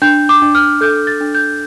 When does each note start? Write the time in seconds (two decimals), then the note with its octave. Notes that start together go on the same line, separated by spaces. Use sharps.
0.02 D4 G6
0.29 D6
0.42 D4
0.55 F6
0.81 A4 G6
1.07 A6
1.21 D4
1.35 G6